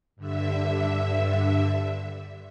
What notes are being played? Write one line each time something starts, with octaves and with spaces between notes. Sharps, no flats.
G2 D3 E5